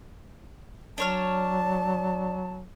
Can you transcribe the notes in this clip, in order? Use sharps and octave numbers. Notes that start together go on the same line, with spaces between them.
F#3 D4 C#5 A5 F6